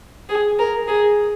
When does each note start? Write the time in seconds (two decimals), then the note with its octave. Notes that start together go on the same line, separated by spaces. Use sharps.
0.29 G#4
0.58 A#4
0.87 G#4